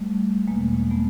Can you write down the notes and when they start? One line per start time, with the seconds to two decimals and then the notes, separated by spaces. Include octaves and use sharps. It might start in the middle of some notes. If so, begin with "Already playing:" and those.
Already playing: G3 A3
0.47 E2 B2 G#3 A#3
0.91 A3 B3